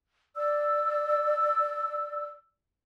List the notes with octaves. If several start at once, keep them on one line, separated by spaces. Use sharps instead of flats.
D5 E6